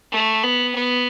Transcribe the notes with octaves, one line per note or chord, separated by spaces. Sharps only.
A3
B3
B3